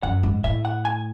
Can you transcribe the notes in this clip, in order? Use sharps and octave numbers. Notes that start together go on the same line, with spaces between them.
F#2 F#5
G#2
A2 E5
F#5
G#5